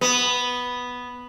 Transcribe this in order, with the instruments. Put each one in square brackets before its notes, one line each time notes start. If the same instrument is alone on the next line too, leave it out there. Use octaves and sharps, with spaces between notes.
[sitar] B3